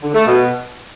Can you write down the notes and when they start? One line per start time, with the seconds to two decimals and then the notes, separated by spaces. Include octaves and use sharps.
0.03 D3
0.14 A3
0.26 B2